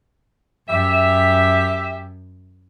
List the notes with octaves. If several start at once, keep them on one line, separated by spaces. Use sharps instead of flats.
F#2 G4 E5